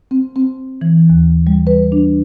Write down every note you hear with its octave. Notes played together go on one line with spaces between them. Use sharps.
C4
C4
E3
D#2
G3
B4
D4